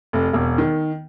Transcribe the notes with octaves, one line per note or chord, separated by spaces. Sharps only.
F1
E1
D#3